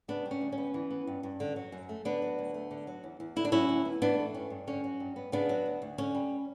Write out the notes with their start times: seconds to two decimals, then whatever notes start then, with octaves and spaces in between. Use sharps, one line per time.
0.08 C#3 B3 D4
0.25 G3
0.31 C#4
0.41 D2
0.52 C#4
0.58 B3
0.74 E3
0.91 B3
1.07 G2
1.23 G2
1.40 D3
1.56 F#3
1.72 F#2
1.89 A3
2.05 D3 B3 D4
2.22 F#3
2.39 D2
2.54 A3
2.71 D3
2.87 F#3
3.04 E2
3.20 E2
3.36 D3 E4
3.45 D4
3.52 F#3 C#4 E4
3.69 D2
3.85 B3
4.02 E3 B3 D4
4.18 A3
4.34 G2 C#4
4.50 G2
4.67 D3 C#4
4.84 F#3
5.00 G2
5.16 B3
5.32 C#3 B3 D4
5.49 F#3
5.66 D2
5.82 D2
5.98 D3 C#4
6.15 G3